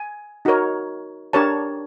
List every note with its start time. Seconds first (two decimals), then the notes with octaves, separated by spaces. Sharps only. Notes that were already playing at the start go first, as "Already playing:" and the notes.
Already playing: G#5
0.45 D#4 F#4 A#4 C#5
1.33 D4 G4 A#4 C#5 A5